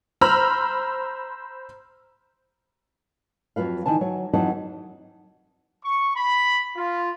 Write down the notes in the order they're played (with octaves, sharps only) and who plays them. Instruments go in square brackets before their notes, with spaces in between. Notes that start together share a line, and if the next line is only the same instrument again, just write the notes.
[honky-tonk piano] C5 A#5 B5 E6 F6
[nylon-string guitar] F2 F#3 F4 B4 F5
D#3 E3 G#5 A5
F#3 C#5
F2 E3 F#3 D#4 F#5 A5
[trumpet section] C#6
B5
F4